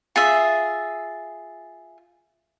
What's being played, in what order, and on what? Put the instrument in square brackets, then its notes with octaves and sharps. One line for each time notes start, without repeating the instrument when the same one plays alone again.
[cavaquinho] F4 G#4 E5